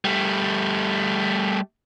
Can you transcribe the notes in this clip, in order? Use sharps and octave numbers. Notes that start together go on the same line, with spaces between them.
G3 A3